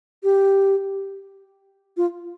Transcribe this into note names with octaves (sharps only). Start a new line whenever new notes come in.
G4
F4